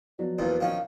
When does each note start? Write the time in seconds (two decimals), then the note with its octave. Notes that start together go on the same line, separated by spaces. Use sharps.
0.19 F3 F#3 B3 D5
0.38 A#1 E2 A#2 B4
0.60 A#1 D#3 C#4 F5